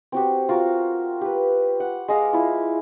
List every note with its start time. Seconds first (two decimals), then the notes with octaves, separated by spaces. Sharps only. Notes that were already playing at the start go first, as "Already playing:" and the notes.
0.12 C4 F#4 G4
0.49 F4 F#4 A#4
1.21 G4 B4
1.80 F#5
2.08 G#3 D#5 F5 D6
2.33 E4 F4